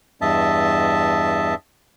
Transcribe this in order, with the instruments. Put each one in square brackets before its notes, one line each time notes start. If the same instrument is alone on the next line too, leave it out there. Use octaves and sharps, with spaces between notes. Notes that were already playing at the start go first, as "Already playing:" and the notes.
[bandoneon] E2 G2 D#5 E5 A5